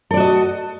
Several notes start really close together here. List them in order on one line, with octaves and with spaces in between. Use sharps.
A4 D5 F#4 D#5